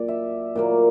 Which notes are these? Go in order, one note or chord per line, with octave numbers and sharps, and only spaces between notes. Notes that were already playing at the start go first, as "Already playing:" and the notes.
Already playing: A#2 F#3 A#3 D5
E5
A#2 F#3 A#3 D5